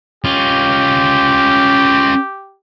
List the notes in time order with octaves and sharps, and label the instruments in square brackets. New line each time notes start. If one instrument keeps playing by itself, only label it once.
[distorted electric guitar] C#4 F4 [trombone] G4